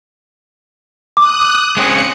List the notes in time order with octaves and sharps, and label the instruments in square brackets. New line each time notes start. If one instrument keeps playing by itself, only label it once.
[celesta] D6 [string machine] D#6 F#6
[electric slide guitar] G#3 C4 C#4 [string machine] C#7